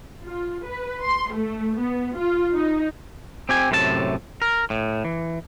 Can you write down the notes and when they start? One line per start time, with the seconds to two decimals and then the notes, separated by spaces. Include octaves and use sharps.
0.25 F4
0.66 B4
1.02 C6
1.33 A3
1.79 B3
2.16 F4
2.54 D#4
3.49 C4 G4 G#5
3.71 F#2 A2 C3 F#4 A5
4.42 A#4
4.70 A2
5.05 E3